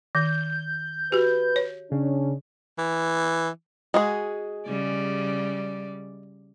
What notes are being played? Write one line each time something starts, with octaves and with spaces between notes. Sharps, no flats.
D#3 G6
F#4 G4 B4
C#5
C#3 C#4 D4
E3
G#3 F#4 G#4
C#3 G3 D5